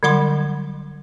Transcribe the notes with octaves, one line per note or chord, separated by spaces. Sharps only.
D3 F#3 G3 F#5 B5 C6